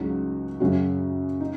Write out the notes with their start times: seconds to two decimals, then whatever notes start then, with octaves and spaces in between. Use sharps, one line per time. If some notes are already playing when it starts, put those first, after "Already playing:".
Already playing: C#2 C#3 F#3 D#4 F#4
0.60 F#2 C#3 F#3 C#4 F#4
1.40 D#4